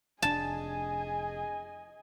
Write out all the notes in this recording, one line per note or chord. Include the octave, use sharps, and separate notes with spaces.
F1 D4 G#4 D#5 G#5 A5